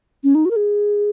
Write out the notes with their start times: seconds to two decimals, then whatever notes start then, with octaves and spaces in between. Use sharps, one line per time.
0.24 C#4
0.35 D#4
0.45 F#4
0.51 A#4
0.56 G#4